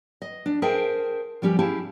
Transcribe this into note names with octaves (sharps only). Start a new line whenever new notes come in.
D#5
D4
G#4 A#4 C5 E5 G5 A5
F3 G3 C#4 G4
C#4 E4 G4 G#4 F5 A5